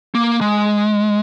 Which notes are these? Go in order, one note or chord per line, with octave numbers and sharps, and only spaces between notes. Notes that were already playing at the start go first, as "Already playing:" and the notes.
A#3
G#3